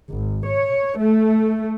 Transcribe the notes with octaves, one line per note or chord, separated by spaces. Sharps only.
G#1
C#5
A3